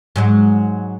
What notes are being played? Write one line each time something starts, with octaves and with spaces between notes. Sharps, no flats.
G#2 F#3 G#3